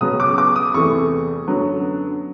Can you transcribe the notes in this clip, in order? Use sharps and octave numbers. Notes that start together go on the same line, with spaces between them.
C#2 B2 F#3 B3 D#6
D6
D6
D#6
E2 C3 E3 A3 C#6
F#2 D3 F#3 B3